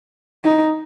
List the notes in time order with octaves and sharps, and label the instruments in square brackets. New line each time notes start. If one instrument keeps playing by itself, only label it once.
[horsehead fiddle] D#4